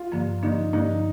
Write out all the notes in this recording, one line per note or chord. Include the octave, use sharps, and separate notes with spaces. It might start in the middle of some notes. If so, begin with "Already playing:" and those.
Already playing: F4
G2 D3 F3 A#3
G2 D3 F3 A#3 D#4
G2 D3 F3 A#3 D#4